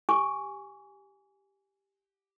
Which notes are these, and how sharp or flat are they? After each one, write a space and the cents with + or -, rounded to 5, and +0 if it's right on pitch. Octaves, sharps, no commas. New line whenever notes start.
G4 +0 G#5 +0 D6 -45